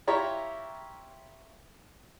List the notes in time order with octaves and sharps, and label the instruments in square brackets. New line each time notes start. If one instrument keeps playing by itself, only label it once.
[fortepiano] E4 F4 G4 C#5 E5 A#5